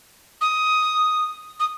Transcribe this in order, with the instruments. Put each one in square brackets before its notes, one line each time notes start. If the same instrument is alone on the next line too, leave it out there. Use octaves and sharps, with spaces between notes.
[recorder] D#6
D#6